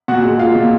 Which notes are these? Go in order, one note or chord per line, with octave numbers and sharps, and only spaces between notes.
A#2 F#4 F#5
G#3
G#3 F4 F5
A#2